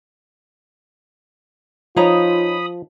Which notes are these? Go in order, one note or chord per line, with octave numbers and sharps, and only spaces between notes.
F3 D#4 F4 C#5 A#5 B5 D#6